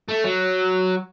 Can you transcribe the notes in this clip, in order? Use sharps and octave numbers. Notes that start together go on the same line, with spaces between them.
A3
F#3